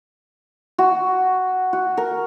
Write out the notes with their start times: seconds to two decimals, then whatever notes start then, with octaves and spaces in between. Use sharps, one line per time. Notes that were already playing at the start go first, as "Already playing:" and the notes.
0.78 F#4
1.73 F#4
1.97 A#4